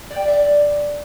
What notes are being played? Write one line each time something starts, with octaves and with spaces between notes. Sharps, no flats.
D5
G5
D5
E5
D5